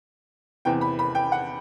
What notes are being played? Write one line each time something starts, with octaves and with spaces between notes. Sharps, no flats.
E2 C3 E3 G5
B5
B5
G5
F#5